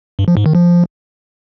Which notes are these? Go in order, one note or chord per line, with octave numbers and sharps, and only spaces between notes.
G2
F3
G#2
D#3
F3